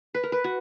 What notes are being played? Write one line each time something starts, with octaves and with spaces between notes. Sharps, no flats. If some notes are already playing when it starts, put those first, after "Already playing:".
B4
A#4
B4
F#4